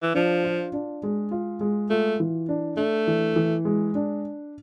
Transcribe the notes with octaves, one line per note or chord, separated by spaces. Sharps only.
E3
F3 D4
F4
D4
G#3
F4
G#3
A3 F4
E3
D4
A3 D4
E3
E3
G#3
D4